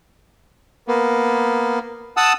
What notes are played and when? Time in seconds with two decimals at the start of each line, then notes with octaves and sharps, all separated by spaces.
0.88 A#3 B3
2.17 F#5 A5 D#6 E6